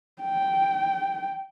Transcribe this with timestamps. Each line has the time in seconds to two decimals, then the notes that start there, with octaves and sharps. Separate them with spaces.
0.22 G5